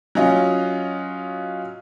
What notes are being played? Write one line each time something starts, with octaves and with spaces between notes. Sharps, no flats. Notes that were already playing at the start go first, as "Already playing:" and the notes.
F#3 C#4 F4 D#5